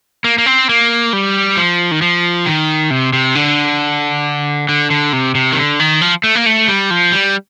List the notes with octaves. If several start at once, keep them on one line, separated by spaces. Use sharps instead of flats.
A#3
A#3
C4
A#3
G3
F3
D#3
F3
D#3
C3
C3
D3
D3
D3
C3
C3
D#3
D3
D#3
F3
A3
A#3
A3
G3
F3
G3